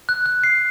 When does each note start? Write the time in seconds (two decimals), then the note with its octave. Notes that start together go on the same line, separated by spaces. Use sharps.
0.09 F#6
0.26 F#6
0.44 C7